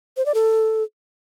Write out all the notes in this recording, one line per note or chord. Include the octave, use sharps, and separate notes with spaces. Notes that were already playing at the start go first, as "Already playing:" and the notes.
C5
D5
A4